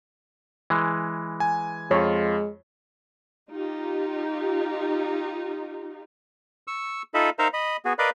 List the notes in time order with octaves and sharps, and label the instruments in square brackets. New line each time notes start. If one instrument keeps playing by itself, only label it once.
[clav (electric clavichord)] E3 G#3
[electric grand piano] G#5
[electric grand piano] F2 F4 [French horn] G#3 [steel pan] C#5
[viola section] D#4 F4 G4
[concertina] C#6 E6
D#4 F4 A4 D#5 E5 B5
D#4 A#4 C5 E5 F5 A#5
D#5 B5
B3 F#4 G#4
A#4 B4 D5 D#5 F5 B5